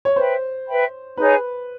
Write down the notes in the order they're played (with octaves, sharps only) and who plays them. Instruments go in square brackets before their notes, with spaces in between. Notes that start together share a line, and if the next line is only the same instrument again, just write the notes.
[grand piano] C#5
[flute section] B4 E5 G5 B5 [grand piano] C5
[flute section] B4 E5 G5 B5
[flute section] D#4 G#4 C#5 [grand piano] B4